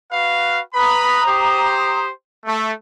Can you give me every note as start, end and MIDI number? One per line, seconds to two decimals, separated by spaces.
0.12 0.60 66
0.12 0.60 71
0.12 0.60 77
0.74 1.26 71
0.74 2.02 82
0.74 1.26 83
0.74 2.02 87
1.26 2.10 67
1.26 2.10 72
2.46 2.72 57